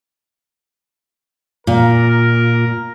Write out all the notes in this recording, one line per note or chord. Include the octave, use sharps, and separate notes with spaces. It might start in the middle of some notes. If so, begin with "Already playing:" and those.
A#2 A#4